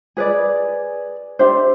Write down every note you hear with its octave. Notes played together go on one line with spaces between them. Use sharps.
G#4 B4 D5
D4 G4 C5 E5